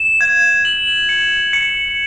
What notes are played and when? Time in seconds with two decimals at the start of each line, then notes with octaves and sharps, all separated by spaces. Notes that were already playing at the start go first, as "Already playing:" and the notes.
Already playing: E7
0.21 G#6
0.65 F#7
1.09 C#7
1.53 C#7